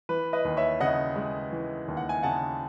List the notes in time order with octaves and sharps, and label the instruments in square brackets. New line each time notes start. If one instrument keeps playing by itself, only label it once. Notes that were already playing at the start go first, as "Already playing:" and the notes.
[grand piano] E3 B4
B4 D#5
D#2
C#5 E5
C#3 D#5 F#5
G#3
E3
D#2
F#5
G#5
C#3 F#5 A5